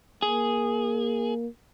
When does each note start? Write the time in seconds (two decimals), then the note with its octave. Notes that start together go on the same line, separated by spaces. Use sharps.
0.22 A#3 G#4